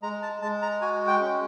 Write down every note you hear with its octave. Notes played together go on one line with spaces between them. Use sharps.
G#3 A#5
A5
G#3 A5
A#5
F#4 G#5
G5
C#4